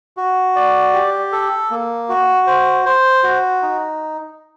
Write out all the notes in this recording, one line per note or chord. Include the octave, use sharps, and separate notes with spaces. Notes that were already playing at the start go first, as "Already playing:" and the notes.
F#4
D5
G4
A4
A#3
F#4
C5
C5
F#4
D#4